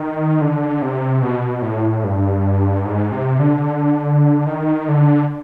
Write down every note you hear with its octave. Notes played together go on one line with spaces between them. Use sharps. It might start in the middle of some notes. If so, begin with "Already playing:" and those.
Already playing: D#3
D3
C3
B2
A2
G2
G#2
C3
D3
D#3
D3